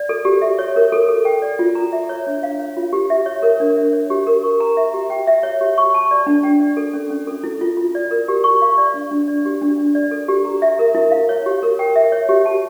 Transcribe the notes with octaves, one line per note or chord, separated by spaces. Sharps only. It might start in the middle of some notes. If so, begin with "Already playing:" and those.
Already playing: D5
A4
G4
E5
C#5
A#4
A4
A4
G5
D5
F4
A#5
E5
C#5
D4
F5
C#5
F4
G4
E5
C#5
A#4
D4
E5
C#5
G4
A#4
C#6
A#5
E5
G4
G5
E5
C#5
G4
C#6
A5
D5
D4
G5
D5
A4
C#4
C#4
A4
E4
F4
F4
D5
A#4
G4
C#6
F5
D5
D4
D4
D5
G4
D4
D4
D5
A4
G4
A#5
E5
A#4
E4
F5
C#5
G4
A#4
G5
E5
C#5
G4
A5